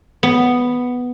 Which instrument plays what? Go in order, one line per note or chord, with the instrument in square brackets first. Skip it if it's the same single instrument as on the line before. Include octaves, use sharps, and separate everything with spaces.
[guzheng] B3